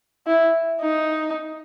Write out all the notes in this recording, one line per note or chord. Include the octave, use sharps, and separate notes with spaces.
E4
D#4